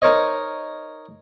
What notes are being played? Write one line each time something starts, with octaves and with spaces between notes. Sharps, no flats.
D#4 A#4 C5 C#5 D#5